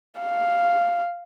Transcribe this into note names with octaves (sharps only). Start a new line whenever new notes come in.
F5